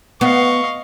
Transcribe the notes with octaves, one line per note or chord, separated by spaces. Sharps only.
B3 D#5 F5 C#6